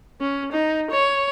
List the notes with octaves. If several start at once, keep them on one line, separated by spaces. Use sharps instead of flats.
C#4
D#4
C#5